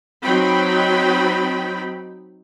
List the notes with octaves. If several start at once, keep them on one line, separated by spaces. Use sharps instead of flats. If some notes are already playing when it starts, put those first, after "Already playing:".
F#3 C4 D#4 G5 B5